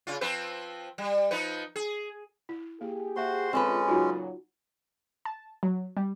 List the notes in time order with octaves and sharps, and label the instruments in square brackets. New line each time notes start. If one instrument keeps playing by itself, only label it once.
[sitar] C#3 F4
F3 C4 B4
G3
F3 D#4 B4
G#4
[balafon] E4
[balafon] A#3 E4 [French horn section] G4 G#4
[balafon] A#3 E5 [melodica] F#4 C5 C6
[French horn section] E2 D3 F4 [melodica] G#3 C#4 [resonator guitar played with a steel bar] C4 A4 B4
[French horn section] A#2 C#3 F#3 [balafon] D#4 F4 F#4
[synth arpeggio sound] A5
F#3
G3